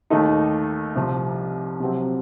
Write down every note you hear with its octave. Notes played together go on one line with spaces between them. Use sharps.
D#2 D#3 A3 D#4
C2 C3 F3
C3 F#3 C4